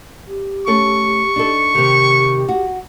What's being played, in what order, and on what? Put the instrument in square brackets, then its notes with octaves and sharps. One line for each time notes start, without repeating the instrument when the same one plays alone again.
[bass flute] G4
[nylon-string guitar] A3 C#4 A4 [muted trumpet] C#6
[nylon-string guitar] D4 D#4 A4
[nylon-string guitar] C3 D#3 [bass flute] G4
[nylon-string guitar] F#4